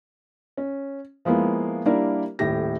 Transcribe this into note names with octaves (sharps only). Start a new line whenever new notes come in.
C#4
F3 G#3 A#3 B3 E4
G3 A#3 D4 E4 A#4 D5
D#1 A2 G4 A#6